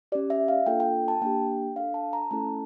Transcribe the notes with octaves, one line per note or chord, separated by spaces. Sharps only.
C#4 G4 D5
E5
F5
A#3 D4 F4 A4 G5
G5
A5
A#3 D4 G4 G5
D4 A4 F5
A5
A#5
A3 C#4 E4 A4 A5